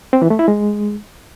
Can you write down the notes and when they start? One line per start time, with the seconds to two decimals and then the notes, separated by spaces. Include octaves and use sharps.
0.13 C4
0.22 E3
0.30 A3
0.39 E4
0.48 G#3